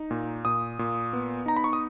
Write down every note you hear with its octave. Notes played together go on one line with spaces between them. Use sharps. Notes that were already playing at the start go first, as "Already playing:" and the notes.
Already playing: D#4
A#2
A#2 D#6
A#2
B3
D#4 A#5
B5
C#6
D#6